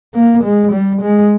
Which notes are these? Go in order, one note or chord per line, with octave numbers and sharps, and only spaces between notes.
A#3
G#3
G3
G#3